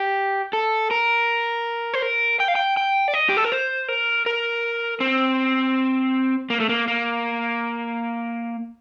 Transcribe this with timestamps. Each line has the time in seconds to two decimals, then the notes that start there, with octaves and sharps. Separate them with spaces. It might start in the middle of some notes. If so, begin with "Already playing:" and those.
Already playing: G4
0.53 A4
0.91 A#4
1.94 C5
2.02 A#4
2.40 G5
2.48 F5
2.55 G5
2.77 G5
3.08 D5
3.14 D#5
3.29 G4
3.37 A4
3.44 A#4
3.52 C5
3.88 A#4
4.26 A#4
5.00 C4
6.50 A#3
6.60 A3
6.69 A#3
6.88 A#3